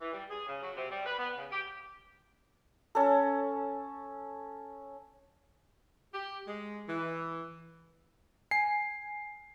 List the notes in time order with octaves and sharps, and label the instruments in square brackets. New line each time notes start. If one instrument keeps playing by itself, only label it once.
[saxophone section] E3
G3
G#4
C#3
F#3
C3
G3
B4
B3
C#3
G4
[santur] C#4 A4
[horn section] G4
G#3
E3
[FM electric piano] G#5 [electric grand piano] C7